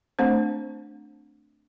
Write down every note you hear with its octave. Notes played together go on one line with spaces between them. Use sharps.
A3 C4 D4 C5